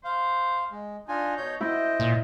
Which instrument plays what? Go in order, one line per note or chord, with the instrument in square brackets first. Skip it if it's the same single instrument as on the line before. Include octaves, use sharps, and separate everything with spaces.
[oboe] C5 [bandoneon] F5
[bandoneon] G#3
[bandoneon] D4 F4 G#5 [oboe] D#4
[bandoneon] B2 C#5 G6
[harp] E4 [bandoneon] C5 D#5 [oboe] G5
[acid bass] A#2